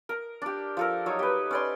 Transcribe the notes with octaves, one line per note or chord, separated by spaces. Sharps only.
A#4
D4 G4
F3 A4 A#4
F#3 D#4 C#5
G4 B4
C#4 D5 C6